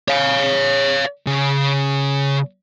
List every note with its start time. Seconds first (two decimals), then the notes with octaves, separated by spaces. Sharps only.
0.08 C#5 F5
1.27 C#3